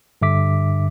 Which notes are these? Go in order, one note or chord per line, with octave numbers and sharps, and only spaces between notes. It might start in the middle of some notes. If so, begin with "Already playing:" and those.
G2 D3 E5 D6 B6